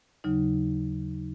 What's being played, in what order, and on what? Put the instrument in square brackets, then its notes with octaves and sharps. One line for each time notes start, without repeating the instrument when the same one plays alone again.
[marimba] D#2 C#3 F#3 D#4